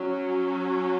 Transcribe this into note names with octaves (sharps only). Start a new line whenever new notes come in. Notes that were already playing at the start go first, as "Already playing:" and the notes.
Already playing: F#3 C#4